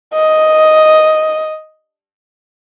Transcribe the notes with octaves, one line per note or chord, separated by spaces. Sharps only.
D#5